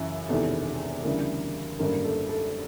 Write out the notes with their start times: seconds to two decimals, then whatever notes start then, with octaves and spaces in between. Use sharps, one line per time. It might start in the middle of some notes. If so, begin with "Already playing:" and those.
Already playing: F#2 C#3 E3
0.29 E1 E2 C3 D#3 A4
1.04 D2 C#3 E3 G3 A#4
1.79 G#1 F#2 D3 G3 A#3 A#4
2.05 A4
2.29 A4